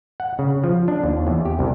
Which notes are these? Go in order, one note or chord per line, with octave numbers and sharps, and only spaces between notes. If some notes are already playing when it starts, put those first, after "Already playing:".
F#5
C#3
F3
D4
D#2
E2
G4
C2